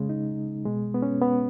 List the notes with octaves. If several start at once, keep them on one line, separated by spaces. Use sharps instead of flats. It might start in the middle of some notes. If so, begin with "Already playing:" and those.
Already playing: C#3 G#3
D#4
B2 G#3
B3
C#4
B3